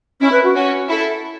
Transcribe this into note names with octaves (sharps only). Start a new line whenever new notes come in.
C#4 E4
B4
F#4
C#4 F#4
E4 A4